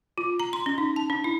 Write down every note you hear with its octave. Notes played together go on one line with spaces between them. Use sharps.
F4
A#5
C6
C#4
D#4
A5
D4
E4